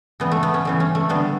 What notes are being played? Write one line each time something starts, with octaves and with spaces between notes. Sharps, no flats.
C#3 E3 G3 B3
A3
B3
C#4
C#3 E3 G3
C#4
A3
D3 G3 B3